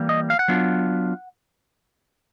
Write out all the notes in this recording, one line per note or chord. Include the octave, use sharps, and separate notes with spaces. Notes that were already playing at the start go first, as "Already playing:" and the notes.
Already playing: E3 G3 A#3
D#5
F5
F#5
F#3 B3 D4 F4